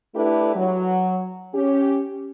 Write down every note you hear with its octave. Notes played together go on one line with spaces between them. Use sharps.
A3 D4 E4 G4 A4 B4
F#3
C#4 G4